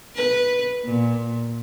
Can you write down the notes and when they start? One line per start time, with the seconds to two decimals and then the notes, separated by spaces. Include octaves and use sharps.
0.15 B4
0.84 A#2